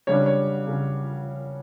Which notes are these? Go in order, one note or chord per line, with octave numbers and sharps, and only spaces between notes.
C#3 G3 D4 C#5
C#5
C#3